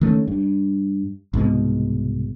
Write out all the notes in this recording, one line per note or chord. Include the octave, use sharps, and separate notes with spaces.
D#3 A3 B3 C#4
G2
C2 G#2 B2 G#3